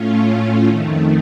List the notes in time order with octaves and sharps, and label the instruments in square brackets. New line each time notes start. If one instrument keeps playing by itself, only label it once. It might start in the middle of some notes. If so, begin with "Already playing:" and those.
Already playing: [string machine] A2 A3 C#4 F4
F2 D#3 A3